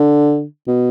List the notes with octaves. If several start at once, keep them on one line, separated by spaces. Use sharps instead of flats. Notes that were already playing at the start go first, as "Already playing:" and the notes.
Already playing: D3
B2